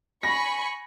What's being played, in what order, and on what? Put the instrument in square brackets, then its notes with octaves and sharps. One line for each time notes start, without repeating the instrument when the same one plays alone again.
[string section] G#5 B5 C#6 [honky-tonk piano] A#6